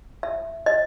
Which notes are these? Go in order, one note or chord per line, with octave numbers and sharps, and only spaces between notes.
E5
D#5